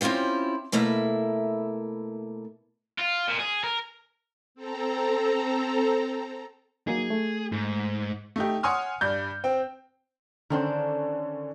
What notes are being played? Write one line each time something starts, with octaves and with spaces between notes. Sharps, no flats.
C4 C#4 E4 F4 G4
B2 A3 A#3 E4 E5
F4
A#2
G#4
A#4
C4 A4 A#5
F#3 A#3 D#4 G#4
A3
G#2
A3 D#4 G4
C#5 F#5 G#5 C6 D#6 F6
G2 D5 G6
C4 G5
D3 D#3 C#4 D4 C5